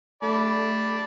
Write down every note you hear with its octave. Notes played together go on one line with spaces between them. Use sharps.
A3 D5 A5 B5